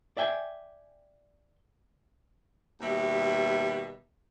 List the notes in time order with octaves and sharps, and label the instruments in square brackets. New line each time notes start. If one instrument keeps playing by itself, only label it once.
[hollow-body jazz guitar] D5 E5 G5 G#5
[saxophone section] D#2 B2 G3 E5